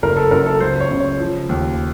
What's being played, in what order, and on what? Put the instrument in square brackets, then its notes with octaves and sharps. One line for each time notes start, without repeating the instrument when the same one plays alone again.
[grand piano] F#1 A#4
A4
F#2 A#4
A4
C#2 C5
C#5
C#3
C#5
F3
D#2